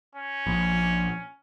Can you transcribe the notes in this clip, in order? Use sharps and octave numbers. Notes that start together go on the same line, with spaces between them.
C#4
A#1